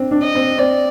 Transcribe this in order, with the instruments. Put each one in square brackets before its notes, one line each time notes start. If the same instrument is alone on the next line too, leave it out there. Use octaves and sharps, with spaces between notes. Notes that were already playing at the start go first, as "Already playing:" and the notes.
Already playing: [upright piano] C4 D4
D4
[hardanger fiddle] D#5
[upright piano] C4
[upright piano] C4 [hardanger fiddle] D5